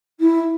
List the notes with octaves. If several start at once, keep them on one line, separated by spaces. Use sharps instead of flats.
E4